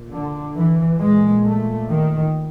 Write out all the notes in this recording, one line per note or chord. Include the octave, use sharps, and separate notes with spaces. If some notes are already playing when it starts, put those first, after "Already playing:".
Already playing: A#2
D3
E3
A#2 G#3
A3
D#3